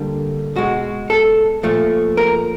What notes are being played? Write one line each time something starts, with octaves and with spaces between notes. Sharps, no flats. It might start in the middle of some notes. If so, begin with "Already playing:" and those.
Already playing: D3 G3 A#3
B2 G#3 F#4
A4
A#2 F3 A3
A#4